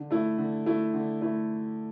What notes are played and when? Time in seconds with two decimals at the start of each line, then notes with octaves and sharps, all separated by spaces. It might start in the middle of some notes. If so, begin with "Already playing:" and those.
Already playing: D3
0.11 A3 E4
0.38 D3
0.66 A3 E4
0.94 D3
1.22 A3 E4